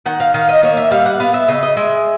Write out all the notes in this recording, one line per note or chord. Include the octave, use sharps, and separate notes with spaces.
D#3 F#5
F5
D#3 F5
D#5
A#3 C#5
E5
G3 F5
F#5
B3 F5
E5
C#3 D#5
D#5
G#3 E5